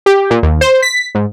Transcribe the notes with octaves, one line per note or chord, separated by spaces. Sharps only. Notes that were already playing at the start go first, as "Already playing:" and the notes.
G4
A#2
D#2
C5
B6
G#2